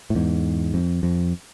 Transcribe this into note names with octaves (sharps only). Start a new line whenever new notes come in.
A2
E2 G#2
F2
F2